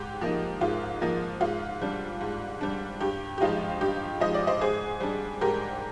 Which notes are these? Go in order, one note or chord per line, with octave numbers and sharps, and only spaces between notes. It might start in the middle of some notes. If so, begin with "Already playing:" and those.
Already playing: G#2 G4
F3 A#3 D#4
G#2 F4
F3 A#3 D#4
G#2 F4
G3 D4
G#2
G3 D4
G2 G4
G4
F3 G#3 D#4 F4
G2 G4
F3 G#3 D#4 D#5
D5
C5 D#5
G#2 G#4 C5
G3 D4
G#2 G4 A#4